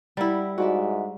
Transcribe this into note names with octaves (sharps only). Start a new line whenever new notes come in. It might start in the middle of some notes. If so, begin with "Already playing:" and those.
G3 E4 A#4 F#5
G#2 F#4 D5 E5